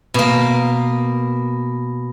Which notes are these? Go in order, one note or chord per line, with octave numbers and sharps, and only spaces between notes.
B2 A#3